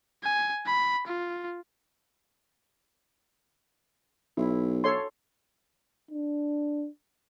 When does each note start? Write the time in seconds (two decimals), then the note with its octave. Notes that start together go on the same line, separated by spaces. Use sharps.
0.24 G#5
0.67 B5
1.07 F4
4.37 B1 E4
4.84 A4 C#5 C6
6.11 D4